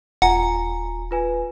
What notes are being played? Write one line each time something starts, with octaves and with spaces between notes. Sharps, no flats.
D#1 F4 F#5 G#5 A#5
F4 B4 G#5